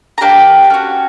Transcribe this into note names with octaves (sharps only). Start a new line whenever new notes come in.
A#5
A#3 D4 G4 G5
C#4 F#4